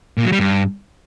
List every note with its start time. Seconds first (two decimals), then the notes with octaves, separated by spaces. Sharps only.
0.18 A#2
0.25 F#3
0.32 G3
0.40 G2